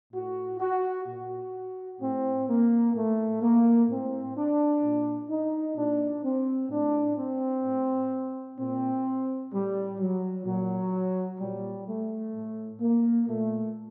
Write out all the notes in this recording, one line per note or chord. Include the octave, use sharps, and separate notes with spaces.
A2 F#4
F#4
A#2 F#4
A2 C4
A#3
A2 A3
A#3
A2 C4
D4
A#2
D#4
A#2 D4
C4
A2 D4
C4
A2
A#2 C4
A2 G3
F#3
A#2 F#3
A#2 G3
A3
A2
A#3
A#2 A3